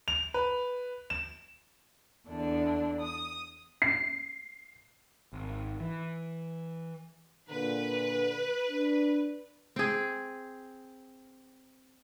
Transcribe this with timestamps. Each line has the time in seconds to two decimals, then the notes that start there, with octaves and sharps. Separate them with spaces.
0.08 F7
0.34 B4
1.10 E7
2.28 E2 D3 D4
3.01 D#6
3.82 C7
5.33 G#1
5.80 E3
7.49 A#2 D3 B4
8.69 D4
9.76 C4 G#4